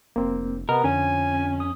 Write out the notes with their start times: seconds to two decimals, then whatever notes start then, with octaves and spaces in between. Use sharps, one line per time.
0.16 F1 A#3 C4
0.69 C3 B3 A#4 D#5
0.84 F2 D3 C#4 G#5
1.60 D#6